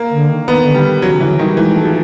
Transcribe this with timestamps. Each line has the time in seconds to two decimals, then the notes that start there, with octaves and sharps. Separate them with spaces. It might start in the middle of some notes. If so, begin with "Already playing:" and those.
Already playing: A#3
0.11 D3
0.29 D#3
0.48 D#3 B3
0.65 D3
0.75 G3
0.84 D#3
1.02 C#3 F#3
1.20 D3 E3
1.39 D#3 G3
1.57 E3 G#3
1.75 A3
1.85 F3